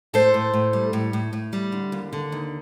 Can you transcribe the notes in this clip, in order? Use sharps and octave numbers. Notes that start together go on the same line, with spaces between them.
A2 A4 C5
A2
A2
G3
A2
A2
A2
G3
D3
D#2
D3
D#2